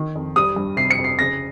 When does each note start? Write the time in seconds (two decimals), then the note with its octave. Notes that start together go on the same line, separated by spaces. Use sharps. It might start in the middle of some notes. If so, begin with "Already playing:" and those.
Already playing: D#3
0.15 F2
0.36 G3 D#6
0.56 G2
0.77 C3 C7
0.90 C#7
0.98 F2
1.04 C7
1.19 C#3 A#6